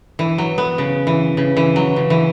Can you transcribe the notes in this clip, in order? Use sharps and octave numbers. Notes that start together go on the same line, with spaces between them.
E3
F#3
B3
C#3
E3
C#3
E3
F#3
C#3
E3